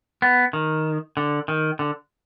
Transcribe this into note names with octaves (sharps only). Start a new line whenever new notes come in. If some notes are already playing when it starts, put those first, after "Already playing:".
B3
D#3
D3
D#3
D3